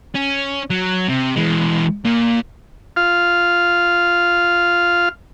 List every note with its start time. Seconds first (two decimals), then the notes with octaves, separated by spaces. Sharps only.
0.15 C#4
0.70 F#3
1.08 C3
1.36 E3 G#3
2.05 A#2 A#3
2.96 F4 F5